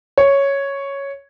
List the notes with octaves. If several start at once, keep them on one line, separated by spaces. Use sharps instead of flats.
C#5